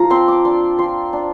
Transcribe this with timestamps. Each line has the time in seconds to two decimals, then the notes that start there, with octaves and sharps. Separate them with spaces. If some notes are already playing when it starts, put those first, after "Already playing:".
Already playing: F3 F4 A#5
0.10 C4 C6
0.28 D6
0.45 D4 C6
0.78 F3 C6
1.13 D4